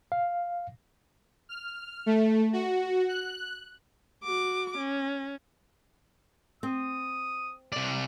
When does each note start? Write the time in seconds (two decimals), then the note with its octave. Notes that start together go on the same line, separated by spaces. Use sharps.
0.12 F5
1.49 F6
2.06 A3
2.53 F#4
3.08 F#6
4.24 F#4 D6
4.78 C#4
6.63 C4 D#6
7.72 C3 D5